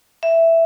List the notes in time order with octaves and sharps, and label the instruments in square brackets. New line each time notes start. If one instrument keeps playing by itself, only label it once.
[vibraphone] E5